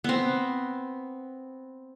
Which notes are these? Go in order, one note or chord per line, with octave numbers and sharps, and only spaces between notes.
B3 C4